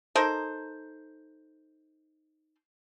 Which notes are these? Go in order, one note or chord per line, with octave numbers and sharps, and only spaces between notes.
D#4 A4 A#4 C5